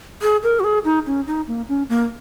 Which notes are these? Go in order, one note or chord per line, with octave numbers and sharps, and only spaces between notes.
G#4
A#4
F#4
G#4
D#4
C#4
D#4
A#3
C#4
A#3